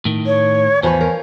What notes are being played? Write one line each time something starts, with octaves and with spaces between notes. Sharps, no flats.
A2 D#3
C#5
E2 F3 B4 C#5 G#5
A#4